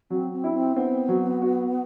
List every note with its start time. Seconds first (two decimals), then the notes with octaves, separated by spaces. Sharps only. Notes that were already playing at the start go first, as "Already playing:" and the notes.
0.10 F#3 C4
0.32 C4
0.44 E4
0.54 C4
0.75 B3 C4
1.08 F#3
1.42 F#4